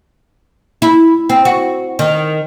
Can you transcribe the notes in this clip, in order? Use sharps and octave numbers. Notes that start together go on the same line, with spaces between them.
E4
C4
F#4
D#3